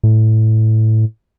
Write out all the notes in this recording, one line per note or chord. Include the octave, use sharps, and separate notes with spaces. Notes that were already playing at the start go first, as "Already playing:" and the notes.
A2